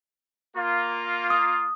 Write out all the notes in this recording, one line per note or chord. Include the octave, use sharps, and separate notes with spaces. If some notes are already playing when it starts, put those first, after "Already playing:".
A#3 F4
D#6